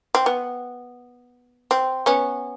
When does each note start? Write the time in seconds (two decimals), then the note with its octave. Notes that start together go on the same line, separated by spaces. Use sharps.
0.15 C4
0.26 B3
1.71 C4
2.06 B3 C#4